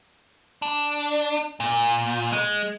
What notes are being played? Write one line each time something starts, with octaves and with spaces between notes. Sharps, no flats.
D4
A#2
G#3